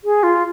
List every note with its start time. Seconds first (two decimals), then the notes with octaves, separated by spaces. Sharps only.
0.04 G#4
0.23 F4